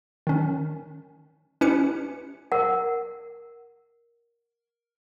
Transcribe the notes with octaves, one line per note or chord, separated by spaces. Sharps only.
D#3 C#4
C#4 E4 G4 B4 C#7
A#4 F#5